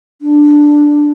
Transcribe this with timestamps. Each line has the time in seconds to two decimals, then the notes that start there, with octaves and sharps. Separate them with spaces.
0.22 D4